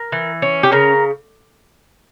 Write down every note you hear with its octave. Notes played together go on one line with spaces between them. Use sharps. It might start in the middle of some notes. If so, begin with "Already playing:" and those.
Already playing: A#4
E3
C#4
G4
C#3 A#4